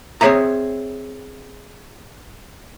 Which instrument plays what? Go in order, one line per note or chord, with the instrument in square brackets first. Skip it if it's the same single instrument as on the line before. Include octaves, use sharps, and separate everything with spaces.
[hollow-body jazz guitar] C4 G#4 B4 C#5 E5 A#5